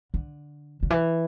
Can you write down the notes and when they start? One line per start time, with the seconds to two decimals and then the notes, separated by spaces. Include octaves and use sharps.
0.14 D3
0.83 D3
0.90 E3